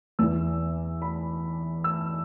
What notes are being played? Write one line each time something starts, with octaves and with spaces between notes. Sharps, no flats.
E2 E3 E6
B5
E6